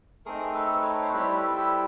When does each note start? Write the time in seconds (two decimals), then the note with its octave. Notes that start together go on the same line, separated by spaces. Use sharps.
0.26 A3 C4 D#4 G#4 A#4
0.54 A4 B4
0.83 B4 C#5
1.03 C5
1.13 G3 C4 E4 B4 C#5
1.35 A4 B4
1.57 G4 A4